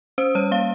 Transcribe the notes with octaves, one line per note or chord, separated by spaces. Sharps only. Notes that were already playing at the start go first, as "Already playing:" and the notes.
C#4 C5
G3 C#5
A#3 F5